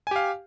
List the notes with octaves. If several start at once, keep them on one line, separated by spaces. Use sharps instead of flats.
G4 F5 G#5